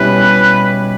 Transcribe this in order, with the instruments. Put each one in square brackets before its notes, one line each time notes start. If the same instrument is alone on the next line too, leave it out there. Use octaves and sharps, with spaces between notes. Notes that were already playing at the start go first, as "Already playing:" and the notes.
Already playing: [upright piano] B2 G3 C#4 E4 G4 [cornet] B4